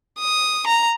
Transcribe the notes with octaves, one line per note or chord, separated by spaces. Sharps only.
D#6
A#5